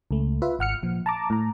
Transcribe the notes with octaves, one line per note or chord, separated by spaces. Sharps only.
C#2 A3
F4 B4 E5
G#1 F#5 F6 C#7
A#2 F3
A5 A#5 D6
A2 A#5